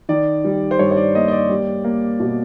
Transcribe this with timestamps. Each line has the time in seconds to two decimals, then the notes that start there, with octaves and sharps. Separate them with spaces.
0.09 D#3 D5
0.44 G3
0.71 C5
0.79 G2 C#5
0.91 C#5
0.97 D5
1.15 A#3 D#5
1.28 D#5
1.31 D5
1.49 G3
1.84 A#3
2.20 B2